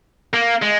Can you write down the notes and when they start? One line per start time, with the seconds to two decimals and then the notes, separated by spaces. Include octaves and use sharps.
0.33 A#3
0.62 G#3